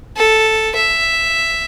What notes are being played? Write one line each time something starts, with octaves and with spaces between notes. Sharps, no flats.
A4
E5